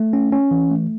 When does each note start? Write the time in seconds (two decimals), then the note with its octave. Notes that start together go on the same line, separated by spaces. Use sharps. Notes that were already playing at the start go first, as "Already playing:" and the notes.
Already playing: A3
0.13 C#4
0.32 C#4
0.51 E3
0.70 A3